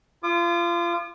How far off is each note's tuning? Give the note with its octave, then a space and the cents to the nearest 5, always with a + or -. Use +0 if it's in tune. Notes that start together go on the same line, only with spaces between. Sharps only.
F4 -30 D6 +40